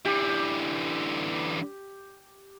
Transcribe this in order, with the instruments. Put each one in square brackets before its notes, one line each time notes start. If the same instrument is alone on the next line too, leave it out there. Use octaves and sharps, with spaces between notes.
[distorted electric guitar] D3 E3 [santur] G4